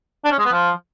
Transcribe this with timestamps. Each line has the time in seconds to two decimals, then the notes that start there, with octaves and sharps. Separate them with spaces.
0.25 D4
0.32 C#4
0.39 G#3
0.46 B3
0.52 F3